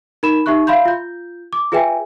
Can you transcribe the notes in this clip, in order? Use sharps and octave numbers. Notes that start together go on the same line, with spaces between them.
D#4 A#4 B5 E7
D#4 G4 E5 C#6 F#6
E5 F5 B5 C6 G6
F4 G6
D6
F4 G#4 B4 E5 G5 G#5